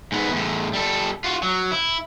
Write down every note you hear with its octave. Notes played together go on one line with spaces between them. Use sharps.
G#2 B3
E2 A2
G3 A4
F4 F#4
F#3
E4